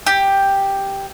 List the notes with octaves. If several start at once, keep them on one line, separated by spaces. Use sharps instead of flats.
G4